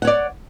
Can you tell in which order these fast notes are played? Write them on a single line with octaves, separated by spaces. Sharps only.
F#5 C#5 D5